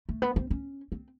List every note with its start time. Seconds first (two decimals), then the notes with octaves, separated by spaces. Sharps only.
0.09 A3
0.22 B3
0.36 C4
0.50 C#4
0.92 C4